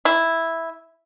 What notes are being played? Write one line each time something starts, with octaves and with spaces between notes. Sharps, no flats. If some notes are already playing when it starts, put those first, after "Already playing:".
E4